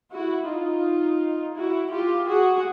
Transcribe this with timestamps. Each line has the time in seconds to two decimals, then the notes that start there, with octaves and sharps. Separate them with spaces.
0.12 E4 F#4
0.49 D#4 F4
1.56 E4 F#4
1.92 F4 G4
2.28 F#4 G#4